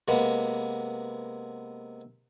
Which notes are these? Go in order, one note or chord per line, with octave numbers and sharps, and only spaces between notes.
C3 G#3 A#3 B3